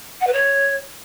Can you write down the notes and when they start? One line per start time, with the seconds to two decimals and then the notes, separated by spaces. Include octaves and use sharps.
0.20 F#5
0.27 B4
0.33 C#5